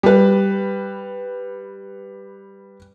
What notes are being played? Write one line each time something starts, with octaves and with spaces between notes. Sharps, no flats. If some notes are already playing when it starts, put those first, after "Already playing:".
G3 B4